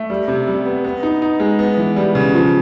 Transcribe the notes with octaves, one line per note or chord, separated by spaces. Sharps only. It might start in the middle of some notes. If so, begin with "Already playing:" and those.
Already playing: A3
G3
C3
G3
B3
B3
D#4
D#4
G#3
B3
E3
G3
C#3
F3